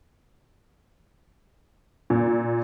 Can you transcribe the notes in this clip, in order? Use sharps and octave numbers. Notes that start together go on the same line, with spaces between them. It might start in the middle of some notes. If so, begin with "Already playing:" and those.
A#2